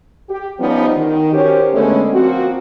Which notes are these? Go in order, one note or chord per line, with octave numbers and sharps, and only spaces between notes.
G4
F3 G3 B3 C#4 D#4
D#3
C#4 F#4 G4 A#4 C5 C#5
D3 G#3 A3 B3 C#4
F3 A#3 C4 F#4